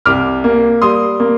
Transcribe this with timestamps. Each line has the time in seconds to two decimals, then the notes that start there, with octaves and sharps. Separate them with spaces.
0.05 C2 D6 F6
0.44 A#3
0.82 G3 C6 D#6
1.20 A#3